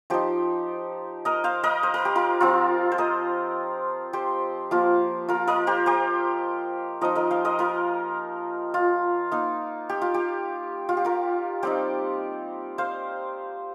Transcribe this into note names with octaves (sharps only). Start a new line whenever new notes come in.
F3 D#4 G4 C5
A#4 D#5
C5 F5
A#4 D#5
C5
A#4
G4
F4 A#4
F3 C4 F4
C5
A#4 D#5
G4 C5
F3 A#3 F4
F4 A#4
A#4 D#5
G4 C5
G4 C5
F3 D#4 A#4 D#5
A#4 D#5
C5 F5
A#4 D#5
F4 A#4
F4
A#3 D#4
G4
F4
G4
F4
G4
F4 A#4
G3 C4 D#4 G4 C5
C5 F5